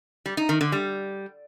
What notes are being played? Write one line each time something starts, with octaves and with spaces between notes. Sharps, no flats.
G3
D#4
D#3
D3
G3